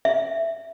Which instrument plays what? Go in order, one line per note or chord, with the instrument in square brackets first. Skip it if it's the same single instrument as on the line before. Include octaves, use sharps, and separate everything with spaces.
[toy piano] E5